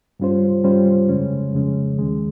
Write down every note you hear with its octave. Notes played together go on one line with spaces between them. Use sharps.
G2 G3 C#4 F4 C5
G2 G3 C#4 F4 C5
F2 C#3 G#3 C#4
F2 C#3 G#3 C#4
D#2 D#3 G#3